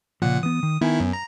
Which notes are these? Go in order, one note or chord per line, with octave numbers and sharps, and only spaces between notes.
A#2 C#3 F3 F#5
E3 B3 D#6
D#3
D#3 B3 E4 G#5
F#2
A#5